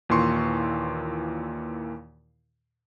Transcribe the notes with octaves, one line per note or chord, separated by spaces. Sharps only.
D#2 A#2 E3 C6 C#6